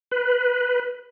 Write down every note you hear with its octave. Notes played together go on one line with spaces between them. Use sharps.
B4